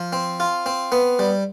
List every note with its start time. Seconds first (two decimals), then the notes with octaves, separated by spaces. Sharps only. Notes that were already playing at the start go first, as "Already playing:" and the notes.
Already playing: F3
0.13 C4
0.40 F4
0.66 C4
0.92 B3
1.19 G3